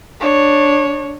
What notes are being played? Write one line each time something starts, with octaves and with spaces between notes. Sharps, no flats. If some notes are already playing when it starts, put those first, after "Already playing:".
D4 C#5